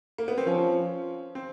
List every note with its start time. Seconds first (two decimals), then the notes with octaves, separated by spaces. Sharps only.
0.18 A#3
0.28 B3
0.38 C4
0.47 F3 C#4
1.35 C4